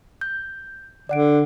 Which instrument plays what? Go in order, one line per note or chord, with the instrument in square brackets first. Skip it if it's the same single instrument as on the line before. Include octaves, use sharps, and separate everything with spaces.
[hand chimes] G6
[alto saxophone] D3 [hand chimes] D5 F#5 D7